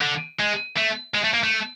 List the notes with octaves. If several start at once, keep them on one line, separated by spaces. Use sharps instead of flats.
D3
G#3
A3
G#3
A3
A#3
A3